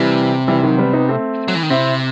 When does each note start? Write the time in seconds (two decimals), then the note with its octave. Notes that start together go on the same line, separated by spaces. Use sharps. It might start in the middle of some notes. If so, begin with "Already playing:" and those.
Already playing: C3 E3 G3
0.48 E3 G3
0.63 D#3 F#3
0.78 G3 B3
0.93 B3 D#4
1.09 A3 C4
1.48 F#3
1.55 E3
1.63 D#3
1.70 C3 C4 E4